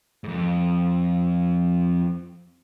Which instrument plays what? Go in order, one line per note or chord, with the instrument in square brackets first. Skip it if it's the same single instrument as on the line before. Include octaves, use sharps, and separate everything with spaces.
[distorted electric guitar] F2 G#2